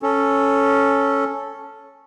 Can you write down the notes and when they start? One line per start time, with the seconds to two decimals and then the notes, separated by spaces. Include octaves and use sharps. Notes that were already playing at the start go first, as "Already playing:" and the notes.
0.02 C#4 A4